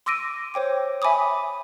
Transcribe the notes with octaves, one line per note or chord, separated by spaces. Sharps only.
C6 D6 E6 A#6 D7 D#7
C5 C#5 G5 D6
E5 G#5 B5 D6 D#6